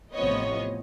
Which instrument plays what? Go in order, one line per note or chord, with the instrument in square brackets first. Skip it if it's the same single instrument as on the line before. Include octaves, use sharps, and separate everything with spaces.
[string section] A1 C3 F3 B3 C#5 D#5